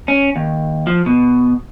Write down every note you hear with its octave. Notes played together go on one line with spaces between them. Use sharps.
C#4
D#2
F3
B2